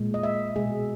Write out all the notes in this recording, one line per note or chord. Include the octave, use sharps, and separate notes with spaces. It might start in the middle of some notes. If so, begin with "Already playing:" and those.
Already playing: A#2 G#3
D#5
E5
B2 G#3 G#4